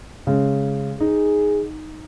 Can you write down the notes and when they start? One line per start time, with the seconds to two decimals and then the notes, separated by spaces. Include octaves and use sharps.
0.27 C#3 G#3
1.00 D#4 G#4